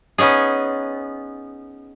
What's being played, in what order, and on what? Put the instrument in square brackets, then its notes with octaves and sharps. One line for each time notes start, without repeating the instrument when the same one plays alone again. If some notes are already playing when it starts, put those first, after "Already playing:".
[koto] B3 C#4 D#4 G#4